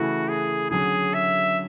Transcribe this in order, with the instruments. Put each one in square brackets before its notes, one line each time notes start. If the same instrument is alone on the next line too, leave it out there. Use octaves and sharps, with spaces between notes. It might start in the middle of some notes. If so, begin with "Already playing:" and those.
Already playing: [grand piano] C#3 E3 A3 E4 [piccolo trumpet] F#4
[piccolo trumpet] G#4
[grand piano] D3 F#3 C#4 [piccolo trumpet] G#4
[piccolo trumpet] E5